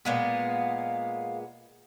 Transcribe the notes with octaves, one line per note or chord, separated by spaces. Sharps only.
A#2 G#3 B3 F5